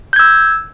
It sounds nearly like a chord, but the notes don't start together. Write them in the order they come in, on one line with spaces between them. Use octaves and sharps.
G6 G#6 E6